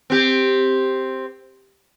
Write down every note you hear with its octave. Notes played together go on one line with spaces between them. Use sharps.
C4 G4